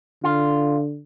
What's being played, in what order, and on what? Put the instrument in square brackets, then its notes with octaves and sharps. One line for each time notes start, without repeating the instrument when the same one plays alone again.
[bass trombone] D3 [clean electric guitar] F4